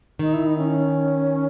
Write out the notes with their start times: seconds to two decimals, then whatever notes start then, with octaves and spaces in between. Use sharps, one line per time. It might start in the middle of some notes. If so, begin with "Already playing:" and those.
0.19 D#3 D#4
0.33 E4
0.46 D#4
0.57 C#4